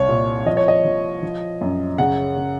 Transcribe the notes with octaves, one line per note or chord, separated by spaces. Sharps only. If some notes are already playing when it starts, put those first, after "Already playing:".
Already playing: C2 C#5
A#2
F3 D#5
C#5
D#5
F3
F3
F#2
C#3 F#5
C#3